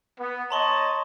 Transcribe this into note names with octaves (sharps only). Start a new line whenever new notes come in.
B3
C#5 D#5 A5 A#5 C6 C#6